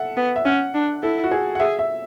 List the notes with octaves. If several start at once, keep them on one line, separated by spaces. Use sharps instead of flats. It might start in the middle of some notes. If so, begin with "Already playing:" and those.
Already playing: A4 E5 F#5
B3
E5
C#4 F#5
D4
E4 A4
F#4
G#4
F#5
G#4 E5
E5